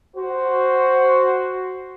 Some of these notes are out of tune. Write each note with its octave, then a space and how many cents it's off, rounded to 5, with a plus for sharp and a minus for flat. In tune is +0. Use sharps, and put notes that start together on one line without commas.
F#4 +5 C5 +0